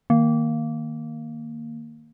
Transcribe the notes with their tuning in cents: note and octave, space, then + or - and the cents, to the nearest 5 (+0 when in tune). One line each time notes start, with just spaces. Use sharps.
D#3 +0 A#3 -10